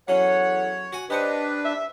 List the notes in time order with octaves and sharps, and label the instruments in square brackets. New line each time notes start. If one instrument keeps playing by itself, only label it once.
[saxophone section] E2 A4 F#5 [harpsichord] F#3 C#4 [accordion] C#5
[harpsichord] F#4 F#5 G#5
[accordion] D4 B4 [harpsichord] G4 C5 C#6 [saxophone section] D#5
[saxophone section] E5